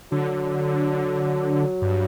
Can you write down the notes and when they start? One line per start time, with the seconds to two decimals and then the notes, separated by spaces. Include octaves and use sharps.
0.11 D3 F#3
1.82 G2